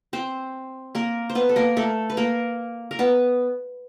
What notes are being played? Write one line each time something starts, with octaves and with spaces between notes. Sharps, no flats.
C4 C5
A#3 A#4
C5
B3 B4
A4
A#3 A#4
A3 A4
B4
A#3 A#4
A#4
B3 B4